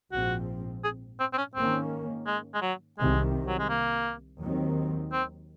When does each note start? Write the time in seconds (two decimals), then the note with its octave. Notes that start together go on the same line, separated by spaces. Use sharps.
0.12 A#1 G#2 F3 C4 F#4
0.84 G#4
1.20 C4
1.33 C4
1.38 C#4
1.55 G#2 D#3 A#3 C4 C#4
2.27 G#3
2.54 G#3
2.62 F#3
2.99 C2 C3 D#3 G#3
3.48 F#3
3.59 G#3
3.69 A#3
4.42 D#2 D#3 F#3 C4
5.13 C4